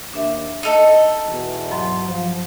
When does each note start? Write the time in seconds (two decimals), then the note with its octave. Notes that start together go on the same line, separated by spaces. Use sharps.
0.14 D#2 D4 E5
0.63 D#4 A4 D#5
1.28 E2 B2
1.71 G2 F#3 C6
2.08 F3